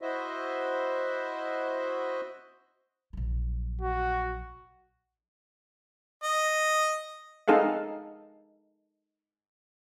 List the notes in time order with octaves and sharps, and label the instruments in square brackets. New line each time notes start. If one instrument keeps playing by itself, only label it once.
[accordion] E4 F#4 C5 D#5 E5
[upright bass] A#1 F#3
[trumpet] F#4
[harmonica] D#5
[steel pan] C4 D#4 G#4 A4 F5 F#5